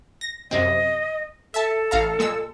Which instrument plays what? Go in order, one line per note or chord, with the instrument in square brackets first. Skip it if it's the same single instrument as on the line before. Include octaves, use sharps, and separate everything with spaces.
[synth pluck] A#6
[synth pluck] F#2 C3 C4 [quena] D#5
[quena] A4 [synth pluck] E5 A5
[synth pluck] A1 F5 A#5
A#2 G#3 E6